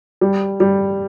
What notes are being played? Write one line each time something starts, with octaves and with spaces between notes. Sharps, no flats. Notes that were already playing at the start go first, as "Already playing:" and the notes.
G3
G3